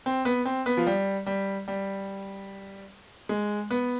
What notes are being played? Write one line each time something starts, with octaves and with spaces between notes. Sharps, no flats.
C4
B3
C4
B3
F3
G3
G3
G3
G#3
B3